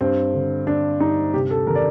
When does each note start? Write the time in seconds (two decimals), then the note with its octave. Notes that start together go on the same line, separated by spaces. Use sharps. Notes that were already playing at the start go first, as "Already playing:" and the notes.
0.01 G2 C4
0.34 D3
0.67 D3 D4
1.00 G2 D#4
1.34 C3 G4
1.51 A4
1.67 D#3 A#4
1.75 D5